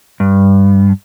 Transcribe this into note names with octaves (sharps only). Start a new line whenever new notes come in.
G2